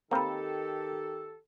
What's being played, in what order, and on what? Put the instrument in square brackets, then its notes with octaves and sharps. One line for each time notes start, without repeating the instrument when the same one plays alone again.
[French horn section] D#3 G4 [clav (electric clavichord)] A#3 C4 [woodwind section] A4 [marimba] A#5 B5